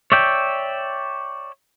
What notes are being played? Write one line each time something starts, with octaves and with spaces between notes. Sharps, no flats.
C#5 D5 E5 G5